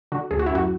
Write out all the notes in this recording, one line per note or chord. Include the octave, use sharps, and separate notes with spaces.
D3 F#4
D2 G#4
F#4
E4
F#2 F#4